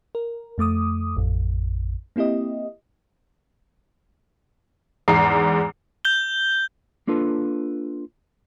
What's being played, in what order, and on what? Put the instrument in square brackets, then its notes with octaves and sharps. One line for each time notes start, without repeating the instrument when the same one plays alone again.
[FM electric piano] A#4
F2 A3 D6 D#6
A1 F2
A#3 C4 E4 G4 D#5
[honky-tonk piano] E2 G#2 A#5 C7
[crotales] G6 G7
[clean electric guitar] A#3 D4 F4 A4 B4